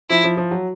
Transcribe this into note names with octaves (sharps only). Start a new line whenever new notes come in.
F3 E4
F3
F3
F#3